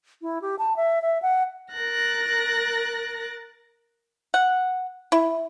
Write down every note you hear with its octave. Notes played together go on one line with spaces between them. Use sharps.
E4
G4
A5
E5
E5
F#5
A#4 F#6 A6 A#6
F#5
E4